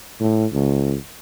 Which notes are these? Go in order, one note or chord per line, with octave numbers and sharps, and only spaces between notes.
A2
C#2